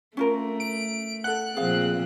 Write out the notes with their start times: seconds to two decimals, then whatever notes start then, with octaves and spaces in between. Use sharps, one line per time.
0.17 A3 C#4 F4 A#4
0.60 D7
1.24 A4 F#5 F#6
1.57 A#2 F3 C4 G#4 F5